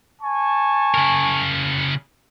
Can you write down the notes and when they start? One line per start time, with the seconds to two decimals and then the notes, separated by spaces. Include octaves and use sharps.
0.22 G#5 A5 C#6
0.94 C#3 A#4